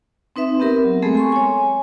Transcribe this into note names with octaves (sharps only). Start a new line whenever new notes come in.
C4 D#4 B4 E5 C6
B3 C4 G4 A#4 E5
F#3
G#3 A3 B3 C4 G#4 A4
G#5 C6 C#6
C#5 G#5